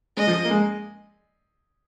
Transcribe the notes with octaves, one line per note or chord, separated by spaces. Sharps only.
G#3 D#5
F3
A#3
G#3